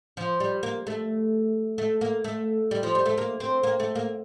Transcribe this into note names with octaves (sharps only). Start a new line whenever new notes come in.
F3
G3
A#3
A3
A3
A#3
A3
G3
F3
G3
A3
A#3
C4
A#3
A3
A#3